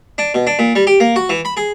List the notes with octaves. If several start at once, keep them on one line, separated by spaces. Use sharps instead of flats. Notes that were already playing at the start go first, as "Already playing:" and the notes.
D4
B2
D4
A#2
G3
G4
A#3
F#4
E3
B5
G#4